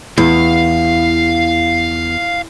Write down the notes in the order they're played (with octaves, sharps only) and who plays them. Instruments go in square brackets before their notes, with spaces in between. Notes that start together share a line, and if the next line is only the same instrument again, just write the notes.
[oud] E2 [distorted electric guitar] F5